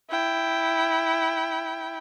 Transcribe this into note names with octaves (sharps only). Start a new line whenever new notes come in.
E4 G5